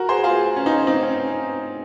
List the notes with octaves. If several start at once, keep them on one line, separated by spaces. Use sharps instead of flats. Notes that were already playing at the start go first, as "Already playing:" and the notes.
Already playing: F#4 A#4
G#4 C5
F4 G#4
C#4
D#4
C#4
C4 D#4
C#4